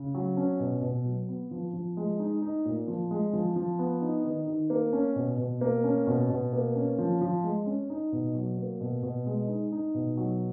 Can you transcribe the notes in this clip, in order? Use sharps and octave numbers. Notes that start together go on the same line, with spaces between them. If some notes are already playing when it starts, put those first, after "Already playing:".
Already playing: C#3
F#3
C#4
B2
B2
F#3
B3
F3
F3
G#3
D#4
D#4
A#2
F3
G#3
F3
F3
B3
D#4
D#3
D#3
A#3
C#4
B2
B2
A#3
C#4
B2
B2
A#3
C#4
F3
F3
G#3
C#4
D#4
B2
F#3
A#3
B2
B2
G#3
D#4
D#4
B2
F#3